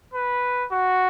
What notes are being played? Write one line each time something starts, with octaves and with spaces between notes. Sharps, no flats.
B4
F#4